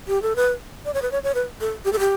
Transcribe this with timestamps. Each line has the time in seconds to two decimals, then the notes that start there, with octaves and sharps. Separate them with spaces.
0.08 G4
0.22 A4
0.36 B4
0.85 D5
0.94 C#5
1.02 B4
1.12 C#5
1.23 C#5
1.35 B4
1.61 A4
1.85 G4
1.93 A4
1.99 G4